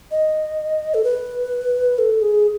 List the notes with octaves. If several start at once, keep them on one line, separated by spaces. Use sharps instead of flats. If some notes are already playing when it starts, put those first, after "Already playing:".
D#5
A4
B4
A4
G#4